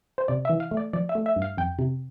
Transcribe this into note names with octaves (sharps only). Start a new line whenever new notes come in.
C5
C3 D5
E5
E3
F5
A3
D5
F3 D5
E5
A3
E5
G2
F5
F2 G5
C3